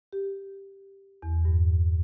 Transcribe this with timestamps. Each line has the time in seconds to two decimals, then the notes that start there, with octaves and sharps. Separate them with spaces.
0.13 G4
1.22 E2
1.45 G2